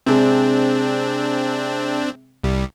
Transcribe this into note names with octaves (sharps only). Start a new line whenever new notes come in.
C3 G#3 C4 D4
C2 G3